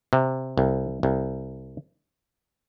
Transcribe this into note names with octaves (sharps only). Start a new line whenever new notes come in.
C3
C2
C2